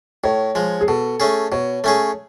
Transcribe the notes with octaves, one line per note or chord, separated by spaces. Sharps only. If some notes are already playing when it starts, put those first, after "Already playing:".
A2 C#5
F3 G#3
G#4
B2 A4
A3 C#4 G#4
B2 C#5
A3 C#4 G#4